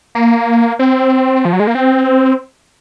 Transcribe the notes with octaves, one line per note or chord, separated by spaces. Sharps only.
A#3
C4
F3
F#3
G#3
A#3
C4